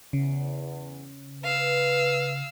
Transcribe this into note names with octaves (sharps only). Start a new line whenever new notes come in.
E2 C#3
B4 F5 E6